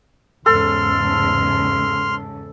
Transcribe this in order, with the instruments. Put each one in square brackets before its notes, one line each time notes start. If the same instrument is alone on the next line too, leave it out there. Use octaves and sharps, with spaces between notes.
[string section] E2 G#2 C#3 [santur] A4 [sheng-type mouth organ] C6 F6